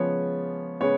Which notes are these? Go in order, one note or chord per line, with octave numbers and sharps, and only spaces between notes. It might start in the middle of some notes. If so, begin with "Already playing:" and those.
Already playing: C#3 F3 G#3 B3 C#5
C#3 G#3 B3 C#5